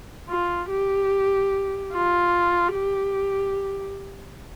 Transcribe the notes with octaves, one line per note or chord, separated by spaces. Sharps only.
F4
G4
F4
G4